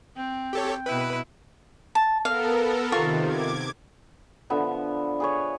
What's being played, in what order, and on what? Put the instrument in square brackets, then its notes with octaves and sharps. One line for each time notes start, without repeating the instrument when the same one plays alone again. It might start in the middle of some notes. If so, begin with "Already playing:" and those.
[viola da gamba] C4 [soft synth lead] G5
[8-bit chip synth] G4 A4 C#5
[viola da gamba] B2 E4 [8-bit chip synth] B4
[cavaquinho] A5
[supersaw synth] B3 A4 A#4 [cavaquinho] F5
[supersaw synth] C3 D#3 [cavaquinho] F4 C#6
[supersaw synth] D6 G#6
[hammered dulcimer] D3 F3 B3 E5
G#4 B4 C#5